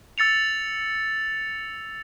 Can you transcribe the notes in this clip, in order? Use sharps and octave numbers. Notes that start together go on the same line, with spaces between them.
E6 A6 C#7 F7